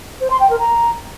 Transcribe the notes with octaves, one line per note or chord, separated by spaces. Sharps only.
C5
C6
G5
A#4
A#5